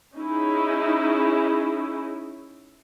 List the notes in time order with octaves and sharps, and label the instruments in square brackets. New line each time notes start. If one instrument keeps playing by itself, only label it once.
[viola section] C#4 D#4 E4 G#4